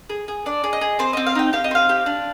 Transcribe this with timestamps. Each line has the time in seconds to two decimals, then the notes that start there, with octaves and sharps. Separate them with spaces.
0.09 G#4
0.28 G#4
0.46 D4 D5
0.64 G#4
0.73 D#5
0.81 G#4
0.99 C4 C5
1.13 C4 D#5
1.27 F5
1.35 D#4 G5
1.53 G4 F5
1.64 D#5
1.71 C4 F5
1.89 G4
2.06 D4